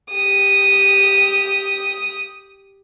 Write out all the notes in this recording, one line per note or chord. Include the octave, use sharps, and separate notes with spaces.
G4 D#6